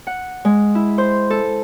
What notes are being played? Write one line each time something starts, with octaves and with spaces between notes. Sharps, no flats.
F#5
G#3
E4
C5
A4